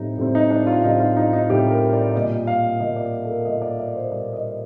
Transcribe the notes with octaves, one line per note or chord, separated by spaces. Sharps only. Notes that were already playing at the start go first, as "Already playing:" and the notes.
Already playing: A2 G3 C4 D#4
A2 G3 C4
D#4
D4
F4
A2 G3 C4 D#4
F4
D#4
D#4
A2 G3 C4 G4
A#4
D5
D5
A#2 G3 A#3 D#5
F5
A#2 G3 A#3 D#5
D5
A4
A#4
A#2 G3 A#3 D#5
D5
D5
C5
A#2 G3 A#3 D5
D#5